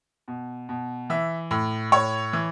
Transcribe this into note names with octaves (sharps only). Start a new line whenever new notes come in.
B2
B2
E3 E5
A2
A2 C#5
E3